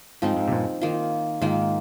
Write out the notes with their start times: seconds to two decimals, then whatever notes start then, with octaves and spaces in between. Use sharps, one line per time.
0.22 G#2 F3 C4 D#4
0.37 G#2
0.48 C3
0.51 G2 A#2
0.81 D#3 A#3 F4
1.42 G#2 D#3 A#3 F4